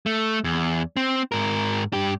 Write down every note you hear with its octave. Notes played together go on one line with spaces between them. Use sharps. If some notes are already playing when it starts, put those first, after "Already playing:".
A3
E2
C4
G#2 A#4
G2 G4